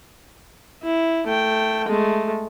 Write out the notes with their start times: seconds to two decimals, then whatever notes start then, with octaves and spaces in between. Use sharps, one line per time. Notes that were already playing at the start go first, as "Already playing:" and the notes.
0.83 E4
1.27 A3 G5
1.88 G#3 A3